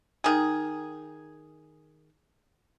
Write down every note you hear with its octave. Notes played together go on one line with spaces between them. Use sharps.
D#3 G#4